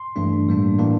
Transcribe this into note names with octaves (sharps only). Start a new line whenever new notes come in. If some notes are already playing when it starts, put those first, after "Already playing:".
Already playing: C6
G2 E3 A3 D4
A2 G3 A#3 D4
A2 E3 A#3 D4